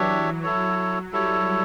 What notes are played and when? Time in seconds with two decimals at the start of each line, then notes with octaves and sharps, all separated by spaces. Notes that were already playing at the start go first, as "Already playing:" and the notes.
Already playing: E3 F#3 D4 G4 C#5 E5
0.43 F#3 E4 A4 C#5
1.12 G3 E4 A4 C#5